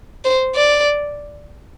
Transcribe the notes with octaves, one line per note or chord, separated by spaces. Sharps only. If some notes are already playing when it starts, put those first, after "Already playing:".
C5
D5